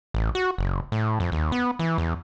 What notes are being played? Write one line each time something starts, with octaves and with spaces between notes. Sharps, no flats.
A1
F#4
F#1
A2
F2
D#2
B3
E3
E2